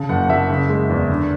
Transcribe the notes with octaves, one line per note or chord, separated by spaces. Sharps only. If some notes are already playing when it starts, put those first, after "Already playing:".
Already playing: C#3 A5
F#1 F#5
F#5
F#1 E5
C#3
G#3
E2
D3